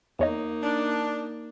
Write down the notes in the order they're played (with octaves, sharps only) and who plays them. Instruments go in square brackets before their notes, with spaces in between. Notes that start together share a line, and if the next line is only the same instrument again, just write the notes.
[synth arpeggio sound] E2 C#5 D#5 [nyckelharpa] A#3 D#4
[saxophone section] D4